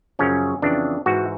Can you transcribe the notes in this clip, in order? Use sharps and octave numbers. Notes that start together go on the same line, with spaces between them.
F#2 C#3 F3 C#4
F2 C#3 E3 D4
G#2 E3 F#4